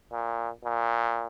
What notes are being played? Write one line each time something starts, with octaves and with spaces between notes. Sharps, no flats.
A#2
A#2